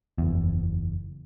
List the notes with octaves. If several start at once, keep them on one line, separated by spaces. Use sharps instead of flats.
F#1 E2